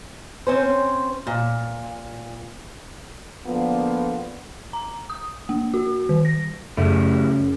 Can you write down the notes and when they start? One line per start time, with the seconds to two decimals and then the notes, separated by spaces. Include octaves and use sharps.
0.47 C4 C#4 C5
1.27 A#2
3.46 D3 F3 A#3 B3
4.73 A#5
5.10 D#6
5.49 A#3
5.74 F#4
6.09 D#3
6.25 A#6
6.77 F#2 C#3 G3 A3 E4